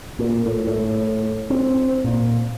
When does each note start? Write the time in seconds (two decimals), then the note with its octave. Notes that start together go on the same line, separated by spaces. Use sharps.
0.19 A#2
0.46 A2
0.67 A2
1.50 C4
2.04 A#2